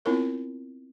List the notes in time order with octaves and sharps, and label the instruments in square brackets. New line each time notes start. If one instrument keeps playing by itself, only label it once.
[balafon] B3 C4 E4 F4 A#4 C#5